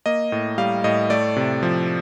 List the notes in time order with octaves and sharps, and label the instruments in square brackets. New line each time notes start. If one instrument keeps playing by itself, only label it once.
[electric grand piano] A#3 D#5
A2
G3 F5
A2 D#5
A3 D5
C3
F3